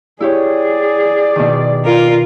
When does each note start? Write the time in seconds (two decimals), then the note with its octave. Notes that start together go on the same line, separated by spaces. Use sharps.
0.20 E4 G4 G#4 C#5 D5
1.36 B2 D#3
1.84 F4 A#4